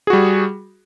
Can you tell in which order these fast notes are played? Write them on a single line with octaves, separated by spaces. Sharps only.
G#4 F#4 G3